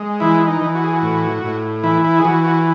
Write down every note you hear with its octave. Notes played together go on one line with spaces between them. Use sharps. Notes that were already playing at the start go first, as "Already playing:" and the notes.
Already playing: G#3
E3 E4
D#4
E3
F#4
G#4
F#4
A2
A2
E3 E4
E4
G#4
E3 F#4
F#4